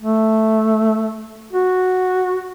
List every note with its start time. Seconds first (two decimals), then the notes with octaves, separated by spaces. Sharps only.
0.01 A3
1.52 F#4